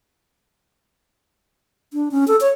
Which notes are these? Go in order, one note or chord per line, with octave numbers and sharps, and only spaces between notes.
D4
C#4
A4
C#5